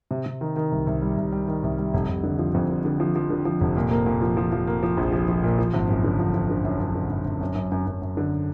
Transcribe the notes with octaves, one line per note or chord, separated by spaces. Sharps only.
C3
C3
D#3
D#3
C2
C2
G3
C2
G3
D#3
C2
G3
F1
F1
D3
F3
F2
D3
D3
F3
F3
D3
F3
F1
A#2
A#3
A#2
F3
F3
F3
A#3
F3
A#1
F3
F3
A#2
F3
G#1
F#2
D3
F3
F3
D3
F#2
F#2
D3
F#2
F#2
F#2
F#2
F#2
F#2
F#2
D3